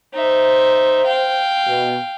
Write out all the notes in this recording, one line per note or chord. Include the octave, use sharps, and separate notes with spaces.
D#4 C5 E5
F5 G5
B2